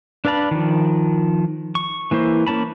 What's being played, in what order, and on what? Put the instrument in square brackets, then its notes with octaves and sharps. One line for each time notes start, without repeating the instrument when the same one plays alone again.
[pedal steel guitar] D4 B4 F5 A5 B5
D#3 F3
C#6
E3 A#3 E4 C5
A#3 C#4 A5 B5